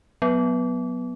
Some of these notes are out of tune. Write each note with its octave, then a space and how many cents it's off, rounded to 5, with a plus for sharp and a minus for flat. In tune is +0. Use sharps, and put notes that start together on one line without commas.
F#3 -10 B3 +0